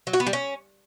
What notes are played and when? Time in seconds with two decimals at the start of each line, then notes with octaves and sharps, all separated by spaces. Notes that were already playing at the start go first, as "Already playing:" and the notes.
0.07 F#3
0.13 F#4
0.20 B3
0.27 G3
0.33 C#4